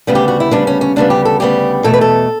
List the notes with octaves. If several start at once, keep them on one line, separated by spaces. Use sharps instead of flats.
D2 C#3 G3 B3
G4
F#4
E4
D2 C#3 G3 B3 D4
C#4
C#4
D2 C#3 G3 B3 D4
G4
A4
D2 C#3 G3 B3 G4
E2 B2 A3 A4
B4
A4